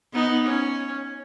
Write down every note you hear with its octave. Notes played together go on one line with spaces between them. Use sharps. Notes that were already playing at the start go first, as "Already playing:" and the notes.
B3 D#4
C#4